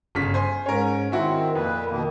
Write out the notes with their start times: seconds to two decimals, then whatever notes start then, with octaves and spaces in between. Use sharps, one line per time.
0.15 G1 C#3 B6
0.34 C5 G#5
0.66 G#2 C#4 A#4 C#5
1.12 D#3 C4 E4 F#4 E5
1.55 F2 A#2 B4
1.90 B2 D#3 A#3